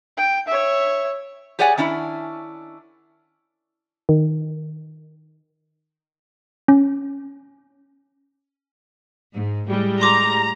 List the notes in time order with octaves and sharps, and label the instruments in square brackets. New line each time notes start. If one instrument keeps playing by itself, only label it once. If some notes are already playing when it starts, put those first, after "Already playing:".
[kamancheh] G5
C#5 E5
[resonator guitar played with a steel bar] G4 G#4 C#5 D5 F#5 G#5
D#3 C#4 D4 E4
[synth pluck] D#3
[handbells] C#4
[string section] G#2
A2 G3 G#3
[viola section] A#5 [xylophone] C6 D6